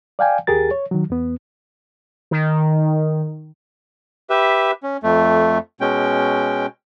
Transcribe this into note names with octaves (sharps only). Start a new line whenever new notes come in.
D5 F5 G5 G#5
D#2 G4 G#4 A#4 A6
C#5
D#3 F#3
E2 B3
D#3
G4 B4 E5
C#4
F2 A3
B2 G#3 C#4 G5